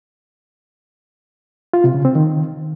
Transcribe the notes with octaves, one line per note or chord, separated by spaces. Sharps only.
F4
C3
C#3
C4
D#3